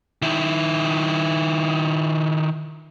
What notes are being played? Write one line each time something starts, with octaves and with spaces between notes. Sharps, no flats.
D#3 E4